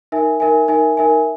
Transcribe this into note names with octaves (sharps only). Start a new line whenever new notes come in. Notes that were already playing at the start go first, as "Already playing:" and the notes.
D#4 A#4 E5 G#5
D#4 A#4 E5 G#5
D#4 A#4 E5 G#5
D#4 A#4 E5 G#5